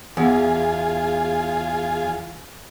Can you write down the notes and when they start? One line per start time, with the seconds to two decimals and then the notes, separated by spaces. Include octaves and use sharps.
0.17 E2 F4 G#4